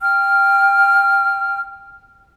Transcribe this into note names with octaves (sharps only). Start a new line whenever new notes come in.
G5 F6